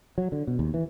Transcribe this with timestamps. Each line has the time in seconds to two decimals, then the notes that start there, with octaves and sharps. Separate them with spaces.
0.18 F#3
0.32 D3
0.47 B2
0.59 D#2
0.74 E3